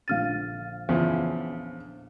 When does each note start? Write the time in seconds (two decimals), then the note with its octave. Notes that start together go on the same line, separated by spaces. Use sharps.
0.08 A#1 D3 F5 F6 A6 D#7
0.89 E2 C#3 F3